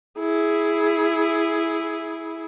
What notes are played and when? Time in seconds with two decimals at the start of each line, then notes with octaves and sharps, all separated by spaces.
0.19 E4 G#4